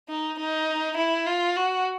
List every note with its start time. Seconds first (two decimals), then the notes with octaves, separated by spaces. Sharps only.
0.09 D#4
0.40 D#4
0.98 E4
1.27 F4
1.56 F#4